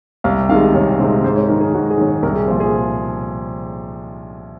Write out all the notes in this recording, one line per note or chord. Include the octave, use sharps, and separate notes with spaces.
C2 F5
C3 D#3 G#3 F5
C2 C#5
C3 D#3 G#3 C5
G#2 C5
C#5
D#3 F#3 A#4
G#4
G#2 F#4
G#4
D#3 F#3
C#5
C2 A#4
G#4
A#2 F3 C5
G#4